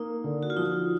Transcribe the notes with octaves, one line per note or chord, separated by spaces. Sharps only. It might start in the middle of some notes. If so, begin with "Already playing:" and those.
Already playing: A#3 D#4
D3
F#4
F4
F3 D#4